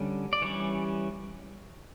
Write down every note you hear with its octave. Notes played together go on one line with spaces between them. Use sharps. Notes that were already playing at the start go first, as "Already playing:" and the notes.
Already playing: D3 G3 C#4
D5
E3 G3 C#4 C#5